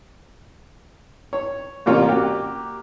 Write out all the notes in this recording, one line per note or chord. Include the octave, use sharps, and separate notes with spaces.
C#5
A1 C3 A#3 C#4 F4 C#5
A#3 F#4 G4